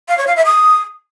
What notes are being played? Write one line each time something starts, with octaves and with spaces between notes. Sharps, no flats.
F5
C#5
F5
E5
D#6